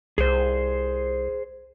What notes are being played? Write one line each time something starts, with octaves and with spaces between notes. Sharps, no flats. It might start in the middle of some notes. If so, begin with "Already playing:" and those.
C2 G#4 C5